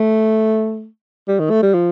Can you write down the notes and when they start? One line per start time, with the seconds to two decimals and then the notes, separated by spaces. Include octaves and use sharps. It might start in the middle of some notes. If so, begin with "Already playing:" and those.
Already playing: A3
1.28 G3
1.39 D#3
1.50 A3
1.62 G3
1.74 F3